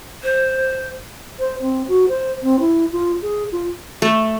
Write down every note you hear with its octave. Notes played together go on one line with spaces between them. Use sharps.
C5
C5
C4
F#4
C5
C4
E4
F4
G#4
F4
A3